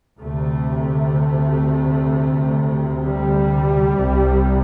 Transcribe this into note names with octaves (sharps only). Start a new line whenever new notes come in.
D2 C3 A3
G3
C2 C3